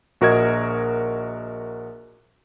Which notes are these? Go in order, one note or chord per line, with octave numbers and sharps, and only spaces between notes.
A#1 F#4 A#4 D#5 G#6